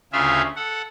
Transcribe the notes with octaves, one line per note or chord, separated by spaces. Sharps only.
D2 C#3 F4 G#4 E5 F5
A4 F#5